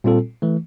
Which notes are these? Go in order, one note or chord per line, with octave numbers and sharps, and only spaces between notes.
A#2 G3 C4 F4 A4
E3 A3